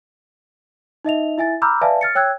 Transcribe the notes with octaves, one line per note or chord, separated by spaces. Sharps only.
D#4 D#5 E5 F7
E4 E5 G#5 A6
A#5 B5 D6 E6 F6 G6
B4 D5 E5 F5 G#5 A5
F6 A6 C#7
C#5 G5 E6 F#6 G#6